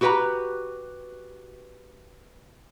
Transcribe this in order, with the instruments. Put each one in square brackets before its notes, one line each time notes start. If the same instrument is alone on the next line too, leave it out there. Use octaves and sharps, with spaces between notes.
[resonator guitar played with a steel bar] F#4 G4 B4 G#5 A#5